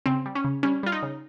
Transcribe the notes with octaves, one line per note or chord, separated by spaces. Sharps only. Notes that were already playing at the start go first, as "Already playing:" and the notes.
C#3 C4
G3
C#4
C#3
G3 C#4
G3 F4
D#4
C#3